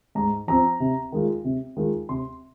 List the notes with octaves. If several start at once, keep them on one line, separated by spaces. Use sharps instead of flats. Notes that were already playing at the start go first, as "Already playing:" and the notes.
G#2 A#5
F3 C4 A#5
C3
D#3 G#3 F4
C3
D#3 G#3 F4
C3 C6